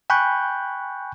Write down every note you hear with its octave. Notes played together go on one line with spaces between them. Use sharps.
G5 G#5 B5 C#6 F#6 G6